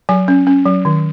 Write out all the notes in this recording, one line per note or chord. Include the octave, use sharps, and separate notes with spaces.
F#3 G#5
C#4
C#4
F#3
D#3